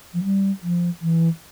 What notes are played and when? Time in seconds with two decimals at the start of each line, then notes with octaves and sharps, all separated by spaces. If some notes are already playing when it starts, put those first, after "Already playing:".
0.14 F3
0.23 G3
0.62 F3
1.01 E3